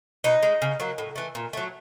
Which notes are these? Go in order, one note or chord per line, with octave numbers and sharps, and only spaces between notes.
B2 D#4
G#3
C#3
F#3 A#3
A2
E3 A3
A#2
F#3 A3